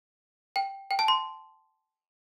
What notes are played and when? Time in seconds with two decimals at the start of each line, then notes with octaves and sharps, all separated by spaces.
0.56 G5
0.91 G5
0.99 A5
1.08 C6